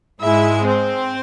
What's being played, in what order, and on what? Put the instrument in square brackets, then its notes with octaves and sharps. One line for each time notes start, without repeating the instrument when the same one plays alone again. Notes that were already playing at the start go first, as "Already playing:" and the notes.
[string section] G#2 G#3 E4 E5
C4 C5